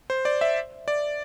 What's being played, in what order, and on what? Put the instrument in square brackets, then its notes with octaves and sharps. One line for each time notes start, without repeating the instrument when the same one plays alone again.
[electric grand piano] C5
D5
E5
D5